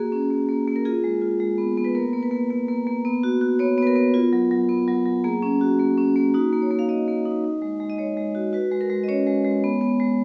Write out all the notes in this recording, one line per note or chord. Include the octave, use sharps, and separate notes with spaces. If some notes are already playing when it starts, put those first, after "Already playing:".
Already playing: A#3 F#4 G#4
C#4
A#3
A#3
A#3
A#4
F4 G#4
G#3
F4
G#3
B3
B3
B4
A#3 A#4
A#3
B4
A#3
A#3
A#3
A#3
B3
F#4
F#4
B3 C#5
B3 B4
A#4
B3
F4
F#3
F#3
B3
F#3
F#3
A#3 G#4
C#4
F#4
A#3
C#4
A#3
D#4 F#4
A#3
C#5
A#3
F5
A#3 D#5
A#3
D#4
D#4
G#3
G#3
D#5
G#3 C#5
G#3
F#4
F#4 B4
G#3
A#4
G#3
D#5
C#4 C#5
G#3
G#3
B3
B3
G#3